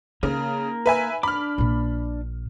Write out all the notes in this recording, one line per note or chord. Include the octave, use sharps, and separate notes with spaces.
C#3 A#3 D#4 A#4
B4 E5 G#5
D4 B5 D6 F6
A#1 A#2